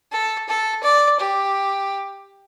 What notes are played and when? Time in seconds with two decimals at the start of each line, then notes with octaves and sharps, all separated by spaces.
0.12 A4
0.49 A4
0.83 D5
1.20 G4